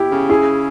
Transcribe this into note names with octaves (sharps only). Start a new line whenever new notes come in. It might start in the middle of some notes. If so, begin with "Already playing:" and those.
Already playing: E4 G4
C#3
E4 G#4